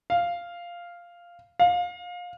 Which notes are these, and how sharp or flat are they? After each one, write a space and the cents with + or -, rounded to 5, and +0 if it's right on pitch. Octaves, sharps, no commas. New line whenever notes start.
F5 -5
F5 +25